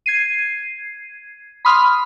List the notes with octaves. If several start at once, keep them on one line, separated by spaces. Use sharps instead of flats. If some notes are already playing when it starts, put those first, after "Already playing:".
G#6 C7 D#7
B5 C6 D#6 F6